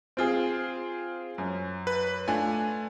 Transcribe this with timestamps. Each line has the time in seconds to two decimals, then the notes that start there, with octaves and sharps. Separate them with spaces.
0.17 C4 F4 G#4
1.38 F#2
1.87 B4
2.28 A3 D4 F4 G#5